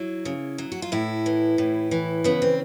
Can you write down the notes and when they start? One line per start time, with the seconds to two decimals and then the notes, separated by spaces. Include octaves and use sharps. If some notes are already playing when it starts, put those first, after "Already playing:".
Already playing: F#3 E4
0.25 C#3
0.58 F#3
0.72 F#4
0.82 F4
0.92 A2 E4
1.26 E3
1.58 A2
1.91 E3
2.24 C#3 B3
2.42 C4